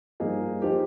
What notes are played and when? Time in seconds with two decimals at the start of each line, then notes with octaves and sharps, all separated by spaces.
0.20 G2 F3 A#3 D#4 G#4
0.62 F3 A#3 D#4 G4